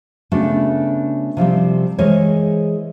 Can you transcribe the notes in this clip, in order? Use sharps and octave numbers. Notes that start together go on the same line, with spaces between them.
C#3 A3 B3 D4 F#4
C3 F3 G3 C4
E3 G#3 G#4 A#4 C5 C#5